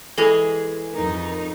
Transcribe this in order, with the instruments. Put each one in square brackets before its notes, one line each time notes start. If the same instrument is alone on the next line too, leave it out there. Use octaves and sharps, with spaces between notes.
[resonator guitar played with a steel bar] E3 G#3 G#4 [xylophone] A4 G#5 F7
[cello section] F2 D#4 [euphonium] A#4